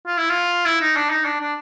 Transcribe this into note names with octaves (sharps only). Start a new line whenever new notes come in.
F4
E4
F4
E4
D#4
D4
D#4
D4
D4